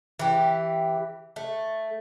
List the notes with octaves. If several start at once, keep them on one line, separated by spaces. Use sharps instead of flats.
E3 G4
A3